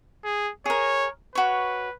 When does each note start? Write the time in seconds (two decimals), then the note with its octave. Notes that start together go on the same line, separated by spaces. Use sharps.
0.25 G#4
0.66 G#4 A#4 C#5
1.35 F#4 B4 C#5